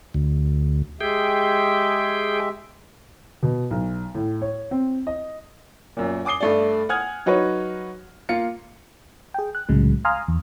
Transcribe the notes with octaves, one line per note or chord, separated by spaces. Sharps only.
D2
G#3 G4 G#4 E5 G5
B2
B1
A2
C#5
C4
D#5
F#2 A#2
G#5 D6 D#6 C7 G7
G2 A3 D5
F#5 G#5 D#6 F6 G#6
F#3 D#4 F#4 B4 C#5
A#3 F4 C#7
G#4 G5
F#6
C2 A2 C#3 F#3 G#3
F5 G#5 A#5 C6 D#6 F6
E2